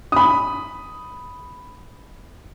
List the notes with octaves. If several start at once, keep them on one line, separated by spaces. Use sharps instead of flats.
B5 D#6